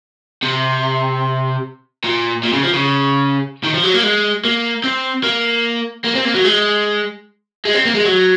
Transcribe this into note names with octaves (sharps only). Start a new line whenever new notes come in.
C3
A#2
A#2
C#3
F3
C#3
D#3
F3
F#3
A#3
G#3
A#3
C4
A#3
A#3
C4
A#3
F#3
G#3
G#3
C4
A#3
G#3
F#3